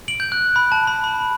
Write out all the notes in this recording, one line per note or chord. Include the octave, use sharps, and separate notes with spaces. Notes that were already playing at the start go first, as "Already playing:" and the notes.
D7 F#7
G6
F#6
B5
A5
B5
B5